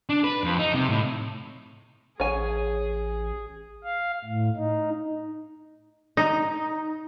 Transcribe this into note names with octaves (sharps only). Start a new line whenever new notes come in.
D4
B4
F2
D#4
C3
A2
A1 G#4 C#5 G#5
F5
A2
D#4
D#4